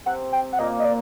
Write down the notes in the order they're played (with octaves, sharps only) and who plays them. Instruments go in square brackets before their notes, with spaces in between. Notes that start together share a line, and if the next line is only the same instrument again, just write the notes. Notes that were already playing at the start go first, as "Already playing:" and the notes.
[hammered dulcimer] C3 C4 [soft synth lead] F#5
[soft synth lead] G5
F#5
[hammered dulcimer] A#2 A#3 [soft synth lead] D#5
[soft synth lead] D#5
D5